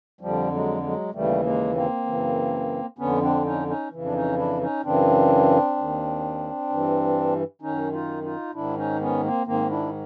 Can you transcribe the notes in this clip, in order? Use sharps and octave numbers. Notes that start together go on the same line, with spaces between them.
F2 D3 F3 G3
F#3 G#3
F#3 G#3
D#2 C#3 E3 G3 A3
G#3 A#3
A#3 C4
F#2 C#3 E3
F2 D3 B3 C#4
C4 D4
C#4 D#4
C#4 D#4
F2 C#3 E3
D4
C#4 D#4
D4 E4
C#4 D#4
F#2 C#3 E3 C4 D4
D#2 D#3
G2 E3
F#2 D#3 C#4 D#4
D#4 F4
D#4 F4
G#2 D#3 D4 E4
C#4 D#4
B3 C#4
A#3 C4
G#2 D#3 A#3 C4
D4 E4